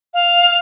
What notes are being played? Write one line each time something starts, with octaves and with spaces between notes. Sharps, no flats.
F5